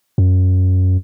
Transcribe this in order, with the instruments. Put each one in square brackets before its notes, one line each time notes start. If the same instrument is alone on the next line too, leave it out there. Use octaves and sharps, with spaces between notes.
[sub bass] F#2